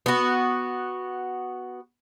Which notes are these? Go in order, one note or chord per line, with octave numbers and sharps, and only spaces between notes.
B3 F#4